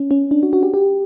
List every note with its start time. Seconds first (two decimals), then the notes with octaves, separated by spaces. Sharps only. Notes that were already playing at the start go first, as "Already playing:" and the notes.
Already playing: C#4
0.11 C#4
0.31 D4
0.43 F#4
0.53 F#4
0.63 G4
0.74 G4